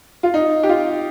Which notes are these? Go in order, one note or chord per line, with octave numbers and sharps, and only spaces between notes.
F4
D#4
G4
F4